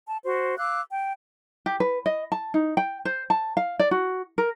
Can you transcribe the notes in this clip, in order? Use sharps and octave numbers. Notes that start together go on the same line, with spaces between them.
A5
F#4 C5
F5 D6 E6 F#6
G5
G4
B4
D#5
A5
D#4
G5
C5
A5
F5
D5
F#4
A#4